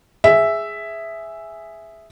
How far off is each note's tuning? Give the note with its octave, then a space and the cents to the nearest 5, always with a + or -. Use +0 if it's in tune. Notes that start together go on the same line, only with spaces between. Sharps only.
G#4 +0 E5 +0